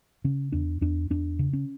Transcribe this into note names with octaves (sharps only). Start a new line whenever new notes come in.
C#3 C#4
E2 D4
E2 D4
E2 D4
C#3
C#4